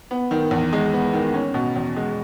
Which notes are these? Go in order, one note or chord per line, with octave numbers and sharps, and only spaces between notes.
B3
D#3
E2
G#3
B3
D#3
C#4
B2
E2
G#3